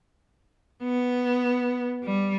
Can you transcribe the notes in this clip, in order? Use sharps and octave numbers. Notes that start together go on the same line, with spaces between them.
B3
G3